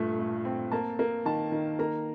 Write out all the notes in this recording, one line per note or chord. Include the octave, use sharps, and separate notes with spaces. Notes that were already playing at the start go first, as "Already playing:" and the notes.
Already playing: G2 A#2 A3
A3
C4
A#3 A5
A#3
D#3 A5
D#3
A#3 A#5